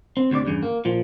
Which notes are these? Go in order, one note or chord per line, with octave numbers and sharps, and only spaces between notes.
C4
D2 C3 C5 D5
E2 G2 C#3
A#3
A#2 F3